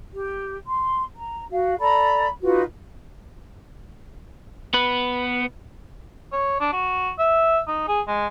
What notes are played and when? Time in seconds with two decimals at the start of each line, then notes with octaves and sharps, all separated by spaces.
0.12 G4
0.65 C6
1.14 A#5
1.50 F#4 F5
1.79 A4 D5 A#5 B5
2.42 D#4 F4 F#4 B4
4.74 B3 B4
6.32 C#5
6.60 D4
6.72 F#4
7.19 E5
7.67 D#4
7.88 G#4
8.08 G#3